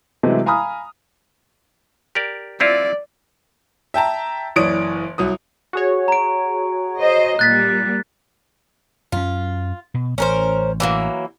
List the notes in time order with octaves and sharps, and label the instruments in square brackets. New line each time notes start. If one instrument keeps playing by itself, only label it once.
[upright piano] C3 E3 F#3 G#3 A3
F5 G#5 A#5 B5 D#6 F6
[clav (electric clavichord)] G4 A#4 D5
[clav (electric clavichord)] C4 E4 F4 [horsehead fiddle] D5
[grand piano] E5 G5 A5 A#5
F#1 E3 C#5 D5 D#6 D7
C2 F#3 D#6
[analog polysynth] F#4 G#4 C#5
[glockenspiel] A#5 D7
[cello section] C5 D#5
[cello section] A#2 G3 [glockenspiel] F#6 A6 B6
[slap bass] F#2 C#4 [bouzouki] F4
[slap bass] B2
[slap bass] A1 [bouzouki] C#4 A#4 C5
[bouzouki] E3 F#3 A#3